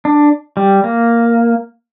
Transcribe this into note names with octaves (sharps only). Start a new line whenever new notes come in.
D4
G3
A#3